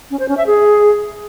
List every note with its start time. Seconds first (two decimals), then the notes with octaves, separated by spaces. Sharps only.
0.11 C#4
0.20 C5
0.29 C#4
0.38 E5
0.47 G#4